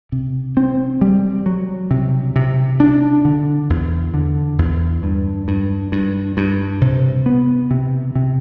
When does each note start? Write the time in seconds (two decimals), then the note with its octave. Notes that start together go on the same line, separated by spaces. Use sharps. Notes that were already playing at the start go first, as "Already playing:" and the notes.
0.12 C3
0.57 C4
1.01 G3
1.46 F#3
1.91 C3
2.36 C3
2.80 D4
3.25 D3
3.70 E2
4.14 D3
4.58 E2
5.03 G2
5.48 G2
5.92 G2
6.37 G2
6.81 C3
7.26 B3
7.71 C3
8.15 C3